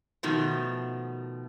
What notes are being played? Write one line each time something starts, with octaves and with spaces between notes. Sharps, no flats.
B2 D#3 F3 A3